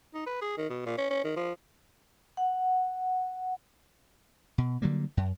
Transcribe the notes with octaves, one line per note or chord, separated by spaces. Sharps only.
D#4
B4
G#4
D#3
B2
A#2
C#4
C#4
D#3
F3
F#5
B2
D3 F#3 G3 A#3
F#2